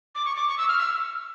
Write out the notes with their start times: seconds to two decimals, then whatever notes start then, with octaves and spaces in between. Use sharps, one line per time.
0.15 D6
0.25 C#6
0.36 D6
0.48 C#6
0.58 E6
0.68 F6
0.79 E6